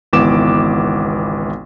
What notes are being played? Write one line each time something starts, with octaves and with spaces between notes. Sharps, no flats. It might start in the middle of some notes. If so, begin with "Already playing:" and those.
G#1 C#2 E3 B3 D6 E7